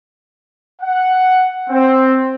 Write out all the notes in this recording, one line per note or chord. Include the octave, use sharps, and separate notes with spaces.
F#5
C4